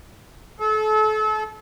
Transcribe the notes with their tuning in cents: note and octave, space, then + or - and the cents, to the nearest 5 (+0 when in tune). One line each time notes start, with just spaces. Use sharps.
A4 -35